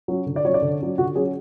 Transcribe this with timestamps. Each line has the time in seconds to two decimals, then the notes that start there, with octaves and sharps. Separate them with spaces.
0.08 F#3 C#4
0.26 D3
0.36 D5
0.45 F#3 C#4 C#5
0.54 D5
0.62 D3
0.80 F#3 C#4
0.98 D3 F#4
1.15 F#3 C#4 G#4